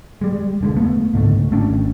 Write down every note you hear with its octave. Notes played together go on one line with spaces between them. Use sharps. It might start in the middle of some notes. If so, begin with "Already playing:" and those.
G3 G#3
F1 D3 G#3
A3 B3
C#2 G#2 D3 A3
G#1 A3 C#4 D4